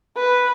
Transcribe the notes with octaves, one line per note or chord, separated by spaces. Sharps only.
B4